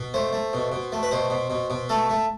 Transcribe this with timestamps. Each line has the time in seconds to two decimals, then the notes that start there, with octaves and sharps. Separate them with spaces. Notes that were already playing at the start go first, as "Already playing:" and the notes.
Already playing: B2
0.14 A3 C5
0.33 A3
0.53 B2
0.72 B2
0.92 A3
1.03 B4
1.11 B2 C5
1.30 B2
1.50 B2
1.70 B2
1.89 A3 A4
2.09 A3